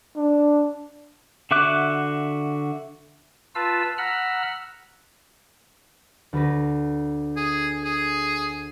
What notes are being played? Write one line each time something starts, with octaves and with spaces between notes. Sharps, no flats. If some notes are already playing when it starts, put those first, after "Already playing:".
D4
D3 F#4 E5 D6 F#6
F4 B4 F5 A5 E6
F#5 A#5 B5 E6 F6
D2 B4 A#6
G#4
G#4